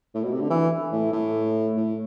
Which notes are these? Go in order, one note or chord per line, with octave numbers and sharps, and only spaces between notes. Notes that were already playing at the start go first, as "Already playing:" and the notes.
A2
B2
C3
D3
E3
A2
A2
A2